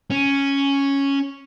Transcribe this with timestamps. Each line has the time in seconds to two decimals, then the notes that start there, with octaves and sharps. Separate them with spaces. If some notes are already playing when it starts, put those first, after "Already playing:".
0.11 C#4